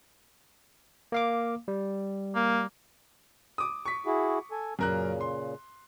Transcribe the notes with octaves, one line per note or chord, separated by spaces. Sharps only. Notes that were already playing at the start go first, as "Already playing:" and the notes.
A#3 F5 D6
G3
A#3
D6 D#6
C#6 B6
E4 F#4 G#4
A4 G#5
F#2 A#2 C#3 A#4 F#6
C6